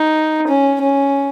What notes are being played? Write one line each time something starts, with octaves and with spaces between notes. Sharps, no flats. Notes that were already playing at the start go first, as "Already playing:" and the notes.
Already playing: D#4
C#4
C#4